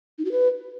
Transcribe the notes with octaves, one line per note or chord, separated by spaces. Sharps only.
D#4
F#4
B4